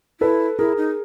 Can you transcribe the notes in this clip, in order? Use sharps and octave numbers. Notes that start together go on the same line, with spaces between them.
E4 A4 B4
E4 G#4 A#4
D#4